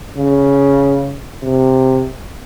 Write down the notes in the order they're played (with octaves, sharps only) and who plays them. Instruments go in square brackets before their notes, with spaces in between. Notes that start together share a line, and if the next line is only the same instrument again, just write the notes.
[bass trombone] C#3
C3